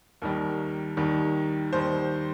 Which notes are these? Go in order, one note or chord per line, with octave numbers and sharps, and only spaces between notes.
D#2 D#3 G3 A#4
D#2 D#3 G3
D#2 D#3 G3 C5